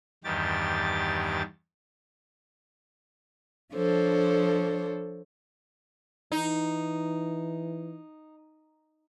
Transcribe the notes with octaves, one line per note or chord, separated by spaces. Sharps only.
E2 G2 D#3 G4 A6
F3 D4 A4 C5 C#5
E3 D#4